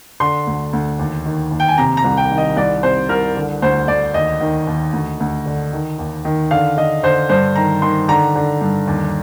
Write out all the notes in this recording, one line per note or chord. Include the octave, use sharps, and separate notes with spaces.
D3 C6
D2
D2
D#2
D#3
D#2
G5
G#5
C3 A#5
A#5
C2
G5
D#3
D#5
C2 D5
C3 C5
C2 A#4
D3
D2 C5
D2 D5
D#2 D#5
D#3
D#2
D2
D2
D3
D#3
D#2
D#3
D3 F5
D3 D#5
D3 C5
G2 C5
D#3 A#5
D#3 C6
D3 A#5
D3
G2
D#2